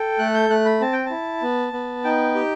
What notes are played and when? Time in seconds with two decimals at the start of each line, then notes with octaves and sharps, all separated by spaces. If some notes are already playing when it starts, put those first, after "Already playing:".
Already playing: A4 G5
0.19 A3 F#6
0.34 G6
0.50 A3 F#6
0.65 B5
0.81 C4 A5
0.93 G5
1.06 E4 A5
1.42 B3
1.73 B3
2.04 D#4 G5
2.35 G4